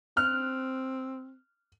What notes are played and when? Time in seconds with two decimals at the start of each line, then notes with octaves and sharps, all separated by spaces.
0.17 C4 F6 F#6